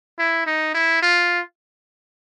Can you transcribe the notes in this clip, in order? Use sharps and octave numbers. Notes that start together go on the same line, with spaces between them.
E4
D#4
E4
F4